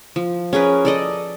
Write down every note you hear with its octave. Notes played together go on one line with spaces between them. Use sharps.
F3
C#4 G#4 A#4 B4
A4 D5 D#5